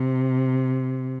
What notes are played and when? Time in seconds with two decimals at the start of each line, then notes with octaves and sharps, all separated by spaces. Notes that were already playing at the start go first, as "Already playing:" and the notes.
Already playing: C3